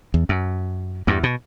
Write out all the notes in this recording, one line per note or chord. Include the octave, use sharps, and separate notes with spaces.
E2
F#2
E2 G2
B2